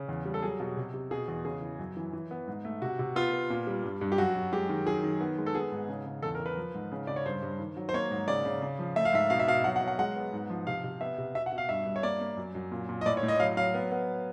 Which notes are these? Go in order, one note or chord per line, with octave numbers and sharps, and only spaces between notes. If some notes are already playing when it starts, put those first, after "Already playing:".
Already playing: C#3
E2
G3
A4
F#3 G#4
B2
C3
C3
B2 G#4
E2
C#3 G#4
E3
F#2
E3
E3
B3
G#2
A3
C3 F#4
C3
B3 F4
B3
A#2
G3
G2
G2
G4
F#2 F#4
F#2
G#3 G4
D#3
F#2 G#4
D#3
B3
G#3
A4
B3 G#4
G#2
C#3
C#3
E2 A4
A#4
E2
B4
F3
G#2
C#3
C#3 D5
C#5
G2 C5
G2
D#3
F#3
C5
A#3 C#5
G#2
C#3 D5
C#3
C#3
F3
A3 E5
F5
G#2 E5
B2 F5
E5
B2 F5
F#3 F#5
F#5
F#3
F#5
G#3 F#5
B3
G#2
F3
C3 F5
C3
B3 E5
C3
B2 E5
F#5
B2
F5
G2 E5
G2
C#5
A#3 D5
A#3
F#2
F#2
A#2
A#2
D#5
A2 D5
C#5
A2
D#5
F#3 F5
F#3 F5
B3
B3